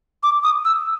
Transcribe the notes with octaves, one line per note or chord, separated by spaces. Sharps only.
D6
D#6
E6